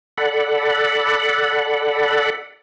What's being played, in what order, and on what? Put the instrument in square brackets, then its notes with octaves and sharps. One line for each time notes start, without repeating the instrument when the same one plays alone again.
[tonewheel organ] A4 D5 F#5 B5